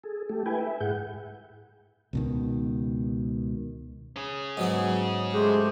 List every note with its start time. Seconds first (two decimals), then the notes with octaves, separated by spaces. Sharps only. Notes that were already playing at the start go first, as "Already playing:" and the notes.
0.04 G#4 A4
0.29 A3 G4 A4
0.46 E4 B4 G5 G#5
0.61 E5
0.80 G#2 G#4 F#5 G6
2.13 C#2 B2 D#3
4.16 C#4 G#4
4.57 G#2 F#3 B3
5.33 G#3 A3 G4 C5